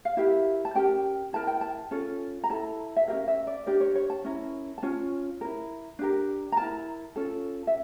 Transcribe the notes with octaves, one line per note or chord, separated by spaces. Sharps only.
F5
E4 G4 A#4 E5
A5
C#4 G4 A#4 G5
E4 A#4 A5
G5
A5
C#4 F4 A4
A#5
E4 A4 A5
E5
C#4 G4 A#4 F5
E5
D5
D4 G4 A#4 D5
C#5
C#5
A5
C#4 E4 A#4
A5
C#4 F4
E4 A#4
D4 G4 A#4
A#5
E4 A#4 A5
C#4 F4 A4
E5